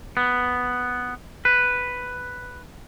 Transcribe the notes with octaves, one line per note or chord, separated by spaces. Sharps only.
B3
B4